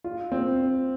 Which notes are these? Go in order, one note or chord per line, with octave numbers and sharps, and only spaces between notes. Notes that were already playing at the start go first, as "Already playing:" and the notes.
F4
C4